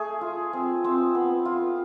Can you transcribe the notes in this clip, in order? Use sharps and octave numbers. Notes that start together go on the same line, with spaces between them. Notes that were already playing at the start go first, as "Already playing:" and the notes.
Already playing: A3 G#4
F4
C4
C4
B3
F4